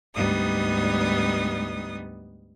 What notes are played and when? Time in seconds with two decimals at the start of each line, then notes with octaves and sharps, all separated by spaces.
0.14 D2 G#2 G3 B3 D#4 D#6